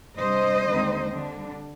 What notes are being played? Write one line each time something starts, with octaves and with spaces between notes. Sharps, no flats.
C3 G3 D4 C5 D#5
D#2 D3 G#3 C4 D#4
D3 G3 D4